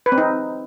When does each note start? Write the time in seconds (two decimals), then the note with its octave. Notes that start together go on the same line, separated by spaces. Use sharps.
0.06 B4
0.12 C4
0.18 D#4